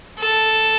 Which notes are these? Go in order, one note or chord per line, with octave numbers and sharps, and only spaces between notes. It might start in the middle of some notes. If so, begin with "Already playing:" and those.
A4